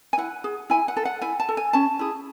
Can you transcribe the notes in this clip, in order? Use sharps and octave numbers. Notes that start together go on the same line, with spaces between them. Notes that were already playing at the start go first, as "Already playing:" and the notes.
G#5
E4 F#5
G#4
E4 G#5
F#5
A4
F#5
E4 G#5
A5
A4
G#5
C#4 A5
E4 G#4